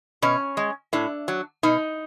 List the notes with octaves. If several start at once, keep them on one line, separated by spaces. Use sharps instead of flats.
B2 C#4
G#3
A2 D4
F#3
B2 D#4